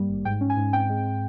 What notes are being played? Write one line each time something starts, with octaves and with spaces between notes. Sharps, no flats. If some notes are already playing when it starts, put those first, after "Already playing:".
Already playing: G2 G3 A#3
G#1
G#2 G5
C#4
G#5
G#2
C4 G5
G#3